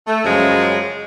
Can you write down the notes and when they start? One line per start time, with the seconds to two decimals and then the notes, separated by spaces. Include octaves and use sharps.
0.07 A3
0.24 F#2 C#3 F3 G#3